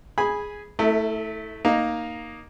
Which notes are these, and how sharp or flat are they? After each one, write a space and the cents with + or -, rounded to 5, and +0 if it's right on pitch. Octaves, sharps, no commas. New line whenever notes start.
G#4 +0 G#5 -10 B5 -10
A3 +0 E4 -25 A4 +45
A#3 +5 D#4 +0